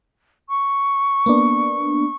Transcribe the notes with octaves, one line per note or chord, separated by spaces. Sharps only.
C#6
A#3 B3 D4